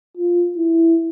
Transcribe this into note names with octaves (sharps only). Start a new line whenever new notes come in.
F4
E4